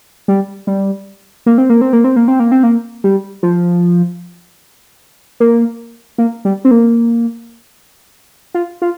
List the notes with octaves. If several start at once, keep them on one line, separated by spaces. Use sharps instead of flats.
G3
G3
A#3
C4
A#3
C4
A#3
C4
A#3
C4
A#3
C4
A#3
G3
F3
A#3
A#3
G3
C4
A#3
F4
F4